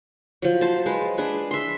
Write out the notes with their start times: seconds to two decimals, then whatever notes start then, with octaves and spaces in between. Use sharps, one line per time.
0.42 F3 F#3
0.61 C5 A5
0.86 G#3 B4
1.18 D4 G#4 B4
1.51 E5 C6